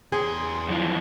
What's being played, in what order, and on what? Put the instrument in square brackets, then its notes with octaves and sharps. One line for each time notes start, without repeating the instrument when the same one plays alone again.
[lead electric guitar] E2 C6 [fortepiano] G#4
[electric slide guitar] F#2 E3 F3